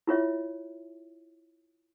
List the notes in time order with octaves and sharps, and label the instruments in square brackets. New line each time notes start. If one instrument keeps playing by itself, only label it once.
[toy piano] E4 F4 C#5 E5